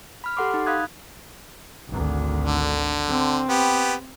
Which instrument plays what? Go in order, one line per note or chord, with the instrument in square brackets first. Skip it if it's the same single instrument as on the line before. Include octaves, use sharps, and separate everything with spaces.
[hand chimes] B5 F6
G4 A4 F#5 C6 D6
D#4
F5 B5 D#6 F#6 G#6
[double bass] G#1 D2
[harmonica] D3
[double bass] C4
[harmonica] B3 G4